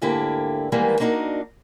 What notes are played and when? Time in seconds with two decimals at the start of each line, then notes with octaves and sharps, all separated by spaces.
0.02 D2 G#2 D3 A#3 E4 G4
0.72 D#3 E3 G3 G#3 A#3 B3
1.00 A#3 D4 D#4 F4 F#4 A#4